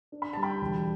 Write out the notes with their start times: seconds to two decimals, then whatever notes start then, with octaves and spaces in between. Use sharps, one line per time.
0.12 D4
0.22 B5
0.33 G3 A5
0.43 G5 B5
0.62 E1